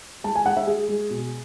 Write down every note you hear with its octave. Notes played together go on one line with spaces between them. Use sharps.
G#3 A5
G#5
G#3 F#5
E5
G#3 G#4
G#3
B2